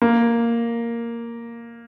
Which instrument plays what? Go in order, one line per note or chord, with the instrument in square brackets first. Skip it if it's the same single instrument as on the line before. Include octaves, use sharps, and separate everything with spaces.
[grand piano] A#3